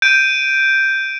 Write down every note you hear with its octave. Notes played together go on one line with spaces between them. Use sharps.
G6 D7 D#7